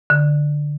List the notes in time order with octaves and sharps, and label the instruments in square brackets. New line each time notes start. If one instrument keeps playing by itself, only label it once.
[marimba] D3